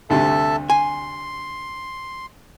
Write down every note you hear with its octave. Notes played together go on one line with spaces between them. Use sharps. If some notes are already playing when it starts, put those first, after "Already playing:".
D2 G2 C3 A4 E5 A5
G#5 C6